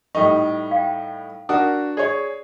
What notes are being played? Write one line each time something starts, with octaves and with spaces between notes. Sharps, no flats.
A2 G3 D#4 A4 C#6
F5 G5
D4 F#4 A#4 D#6
G#4 C#5 D5